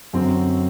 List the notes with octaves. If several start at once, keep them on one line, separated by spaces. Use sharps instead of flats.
F#2 D3 F#3 C4